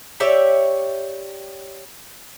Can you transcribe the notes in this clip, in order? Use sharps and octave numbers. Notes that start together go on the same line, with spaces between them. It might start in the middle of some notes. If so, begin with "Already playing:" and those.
G4 C#5 D5 E5